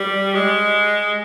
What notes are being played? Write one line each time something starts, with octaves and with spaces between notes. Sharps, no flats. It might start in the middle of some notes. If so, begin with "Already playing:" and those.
Already playing: G3
G#3